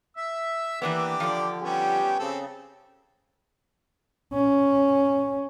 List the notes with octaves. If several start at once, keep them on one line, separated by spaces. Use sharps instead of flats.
E5 E6
E3 A#3 B3 D4 G4 D6
D3 F3 D5
G3 B3 C#4 G4
C#3 C4 A4
C#4